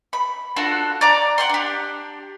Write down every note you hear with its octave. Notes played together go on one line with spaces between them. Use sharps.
B5
D4 F4 F#4 A4
D5 A#5 D6
F#5 G5 C6
D4 G4